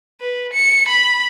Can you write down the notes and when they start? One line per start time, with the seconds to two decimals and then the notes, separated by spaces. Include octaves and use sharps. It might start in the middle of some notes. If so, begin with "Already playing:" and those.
0.21 B4
0.53 C#7
0.88 B5